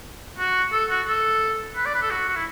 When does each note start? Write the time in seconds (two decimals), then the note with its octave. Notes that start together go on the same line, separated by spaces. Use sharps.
0.38 F#4
0.72 A4
0.90 F#4
1.07 A4
1.76 B4
1.85 D5
1.94 B4
2.02 A4
2.10 F#4
2.28 F#4
2.36 E4